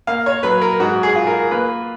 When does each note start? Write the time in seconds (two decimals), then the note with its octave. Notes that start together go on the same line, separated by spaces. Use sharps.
0.07 A#3 F5
0.26 C#5
0.43 F#3 B4
0.62 A#4
0.79 G#2 F#4
1.03 G#4
1.16 F4
1.27 A#4
1.51 A#3 B4